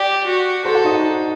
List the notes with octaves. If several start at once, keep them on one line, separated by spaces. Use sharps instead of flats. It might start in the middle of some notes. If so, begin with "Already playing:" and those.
Already playing: G4 D5 D6
F#4
A4 C5 C6
F#4 F#5
D#4 D#5